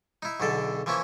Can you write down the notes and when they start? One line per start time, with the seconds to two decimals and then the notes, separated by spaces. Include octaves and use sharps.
0.22 D#4 E4
0.40 B1 E2 B2 D3 A4
0.86 E3 F3 A#3 C#4 E4